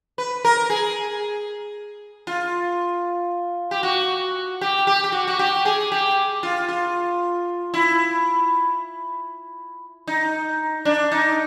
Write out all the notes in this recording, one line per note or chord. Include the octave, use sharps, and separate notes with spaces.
B4
A#4
G#4
F4
G4
F#4
G4
G4
G4
F#4
F#4
G4
G#4
G4
F4
F4
E4
D#4
D4
D#4